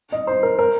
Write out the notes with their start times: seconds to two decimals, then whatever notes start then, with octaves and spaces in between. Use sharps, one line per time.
0.12 D#5
0.27 C5
0.43 A#4
0.59 A#4